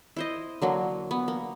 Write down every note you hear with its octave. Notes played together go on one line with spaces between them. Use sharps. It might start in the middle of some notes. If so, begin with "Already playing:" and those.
E4 C5 D#5
D3 F#3 A#3
B3
A#3